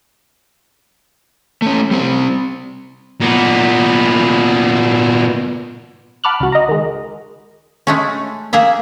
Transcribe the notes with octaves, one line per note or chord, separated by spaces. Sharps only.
A3 C#4
G3 C4
A#2 B3
F#5 A5 B5 D6 F6 F#6
C#2 F#4
D#5 A#5
D#3 G#3
G#3 A3 C#4
A#3 G#4 A#4 E5